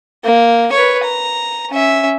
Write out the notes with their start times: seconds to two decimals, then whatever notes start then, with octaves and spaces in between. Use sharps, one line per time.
0.24 A#3
0.73 B4 C#5
1.04 A#5
1.70 C#4 E5